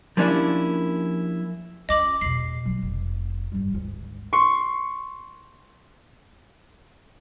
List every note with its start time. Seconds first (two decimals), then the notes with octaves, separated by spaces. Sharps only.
0.17 F3 A#3 C#4 D4 E4 G4
1.89 C#4 F4 D#5 D6 F#7
2.21 E2 B2 C7
2.65 F#3 F4
2.82 F1
3.52 G2 G3
3.72 G#1 D2
4.33 C6 C#6